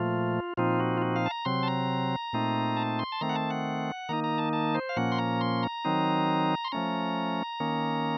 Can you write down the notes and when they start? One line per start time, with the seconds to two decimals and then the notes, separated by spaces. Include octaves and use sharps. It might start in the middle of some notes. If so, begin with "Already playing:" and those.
Already playing: A#2 F3 A3 F4
0.57 A#2 F3 C4 D#4 F4
0.80 F#4
0.97 F4
1.02 F#4
1.16 F5
1.26 A5
1.31 A#5
1.45 C3 F#3 C4 C6
1.63 A5
1.68 A#5
2.33 A#2 A3 C4 D#4
2.77 A5
2.99 C6
3.12 A5
3.21 D#3 A3 C4 A#5
3.29 F#5
3.35 A5
3.50 F#5
4.09 D#3 A#3 D#4 A#5
4.24 A#5
4.38 A5
4.53 A5
4.75 C5
4.89 F5
4.97 A#2 F3 A#3 C#4 F#5
5.12 C6
5.18 A#5
5.41 C6
5.63 A#5
5.85 D#3 F#3 C4 D#4
6.65 C6
6.72 F3 A3 C#4 A#5
7.60 D#3 A#3 C#4